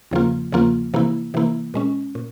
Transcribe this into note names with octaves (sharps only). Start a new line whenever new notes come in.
E2 C#3 F3 A#3 F4
E2 C#3 F3 A#3 F4
C3 E3 A#3 E4
C3 E3 A#3 E4
A#2 G#3 C#4
A#2